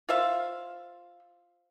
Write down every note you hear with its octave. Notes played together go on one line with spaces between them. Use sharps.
F4 C5 E5 F5